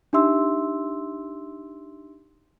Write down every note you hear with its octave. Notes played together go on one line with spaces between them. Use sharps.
D4 D#4 G4 E5 C6 E6